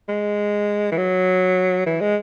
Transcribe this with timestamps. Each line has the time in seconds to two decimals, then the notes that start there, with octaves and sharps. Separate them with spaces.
0.09 G#3
0.92 E3
0.97 F#3
1.86 E3
2.01 G#3